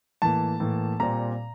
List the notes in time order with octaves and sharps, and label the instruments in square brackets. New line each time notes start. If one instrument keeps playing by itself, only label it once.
[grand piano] A2 E3 A#3 A5
A2 E3 A#3
A#2 G3 C4 A#5